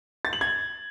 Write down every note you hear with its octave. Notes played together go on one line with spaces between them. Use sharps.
A6
F#7
G#6